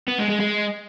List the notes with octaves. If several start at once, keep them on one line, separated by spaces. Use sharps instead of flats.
B3
G#3
G#3
G#3